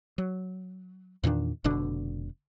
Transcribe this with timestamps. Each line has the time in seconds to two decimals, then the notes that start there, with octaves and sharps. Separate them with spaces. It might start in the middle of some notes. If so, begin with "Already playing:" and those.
0.18 F#3
1.24 E2 A#2 D#3 D4
1.64 F1 B2 D3 D4